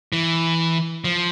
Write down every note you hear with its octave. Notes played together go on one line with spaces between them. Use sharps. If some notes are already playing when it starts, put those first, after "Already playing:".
E3
F3